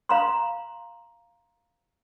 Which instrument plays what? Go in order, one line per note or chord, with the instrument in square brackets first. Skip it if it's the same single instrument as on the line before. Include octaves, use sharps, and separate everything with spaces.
[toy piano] F5 A#5 C6